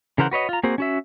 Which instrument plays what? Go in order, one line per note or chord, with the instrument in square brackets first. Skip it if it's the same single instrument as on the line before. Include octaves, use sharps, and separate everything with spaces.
[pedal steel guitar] C#3 E3 A#4 C5 F#5
F#4 B4 C#5 D#5
F4 A#5
A#3 C4 F#4 G#4 C5
C#4 F#4 E5